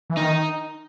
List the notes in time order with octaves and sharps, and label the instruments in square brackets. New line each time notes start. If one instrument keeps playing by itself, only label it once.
[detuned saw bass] E3
[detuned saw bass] D#3 [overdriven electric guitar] D#4